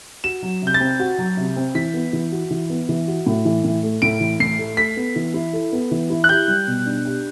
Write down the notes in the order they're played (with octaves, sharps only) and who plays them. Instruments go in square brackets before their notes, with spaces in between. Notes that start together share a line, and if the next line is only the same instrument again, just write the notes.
[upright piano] F#4 [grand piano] E7
[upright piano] F#3
C3
[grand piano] G6
A6
[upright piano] C4
F#4
F#3
C3
C4
[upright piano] E3 [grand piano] B6
[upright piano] B3
E3
F#4
E3
B3
E3
F#4
A2
E3
A2
A3
[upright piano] A2 [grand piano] D7
[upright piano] E3
[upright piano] A2 [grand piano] C7
[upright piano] A3
[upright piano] A4 [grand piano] B6
[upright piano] B3
E3
E4
A4
B3
E3
E4
[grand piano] F#6
[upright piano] G4 [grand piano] G6
[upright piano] G3
B2
D4
G4